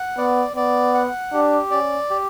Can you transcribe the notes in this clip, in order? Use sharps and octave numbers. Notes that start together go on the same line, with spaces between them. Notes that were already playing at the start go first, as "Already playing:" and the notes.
Already playing: F#5
B3 D5
B3 D5
F#5
D4 G4
C#4 D5
G4